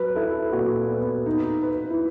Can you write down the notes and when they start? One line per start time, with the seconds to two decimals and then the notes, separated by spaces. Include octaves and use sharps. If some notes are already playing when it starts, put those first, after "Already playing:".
Already playing: F#3 B4
0.16 E4 A4
0.52 A#2 F#4
0.89 B3
1.26 D#4
1.63 B4
1.91 E4